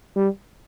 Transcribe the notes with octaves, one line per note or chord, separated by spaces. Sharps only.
G3